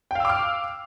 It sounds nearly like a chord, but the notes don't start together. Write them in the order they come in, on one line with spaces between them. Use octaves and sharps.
G5 F5 E6 D6 F6